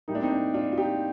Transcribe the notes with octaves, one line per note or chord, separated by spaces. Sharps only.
A2 G3 A#3 D#4
D4
C4 D#4
D4
D4 F4
F4
D#4 G4